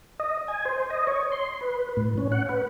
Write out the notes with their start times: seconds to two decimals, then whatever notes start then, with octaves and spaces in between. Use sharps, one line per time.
0.20 D#5
0.48 G#5
0.65 C5
0.90 D#5
1.07 C#5
1.32 C6
1.61 B4
1.97 A2
2.18 C#4
2.32 F#5
2.49 B4